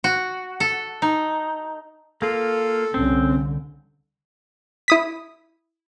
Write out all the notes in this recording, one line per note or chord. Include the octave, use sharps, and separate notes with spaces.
F#4
A4
D#4
A#3 F4 A4
C2 D3 C4 C#4
E4 D#6 B6